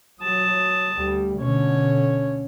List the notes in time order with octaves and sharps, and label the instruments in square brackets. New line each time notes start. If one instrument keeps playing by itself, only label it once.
[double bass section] F#3 [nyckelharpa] A5 D#6
[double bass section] D2 G3
[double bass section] B2 D3 [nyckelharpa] C#4 C#5